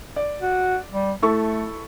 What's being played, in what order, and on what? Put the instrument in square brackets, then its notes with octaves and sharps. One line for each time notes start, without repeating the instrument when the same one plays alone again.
[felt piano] D5
[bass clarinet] F#4
G3
[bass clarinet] A3 [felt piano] E4 A4 C#6